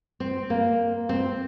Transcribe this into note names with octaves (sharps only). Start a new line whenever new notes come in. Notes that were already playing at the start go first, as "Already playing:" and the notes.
C4
A#3
C4